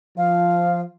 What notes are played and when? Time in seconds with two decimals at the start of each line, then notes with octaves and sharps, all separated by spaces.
0.18 F3 F5